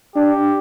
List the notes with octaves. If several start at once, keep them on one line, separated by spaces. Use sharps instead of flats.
D4 G4